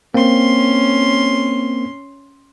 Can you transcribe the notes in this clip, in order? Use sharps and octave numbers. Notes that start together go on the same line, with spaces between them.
A#3 C4 C#4 C6